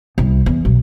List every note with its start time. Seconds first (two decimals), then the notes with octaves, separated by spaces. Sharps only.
0.18 C2
0.46 E2
0.65 B1